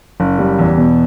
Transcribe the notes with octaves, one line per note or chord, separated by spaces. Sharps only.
F#1
G3
E2
B2